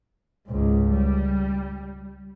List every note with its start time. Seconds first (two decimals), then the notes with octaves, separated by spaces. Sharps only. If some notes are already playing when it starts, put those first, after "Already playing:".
0.47 C#2 G#2
0.89 G3